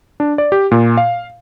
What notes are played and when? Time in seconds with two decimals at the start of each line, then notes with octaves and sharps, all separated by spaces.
0.20 D4
0.38 D5
0.52 G4
0.71 A#2
0.97 F5